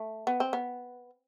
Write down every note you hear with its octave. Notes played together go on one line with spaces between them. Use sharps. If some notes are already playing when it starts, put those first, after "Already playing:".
Already playing: A3
B3
C4
B3